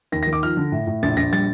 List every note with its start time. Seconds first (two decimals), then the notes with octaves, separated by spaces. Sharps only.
0.12 D#2 A#6
0.23 A#6
0.27 D#3
0.33 D6
0.43 F3 F6
0.57 D3
0.72 A2
0.87 A2
1.03 A#1 A6
1.17 A#1 A#6
1.32 G3 A6